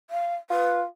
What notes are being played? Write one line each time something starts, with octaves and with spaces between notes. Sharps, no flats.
F5
F4 B4